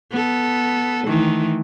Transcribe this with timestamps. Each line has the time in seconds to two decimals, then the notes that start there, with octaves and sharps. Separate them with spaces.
0.11 B3 A4
1.06 D#3 E3 A3